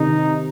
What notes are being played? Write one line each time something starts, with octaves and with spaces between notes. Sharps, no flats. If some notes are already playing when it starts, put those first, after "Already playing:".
Already playing: C3 D#3 D#4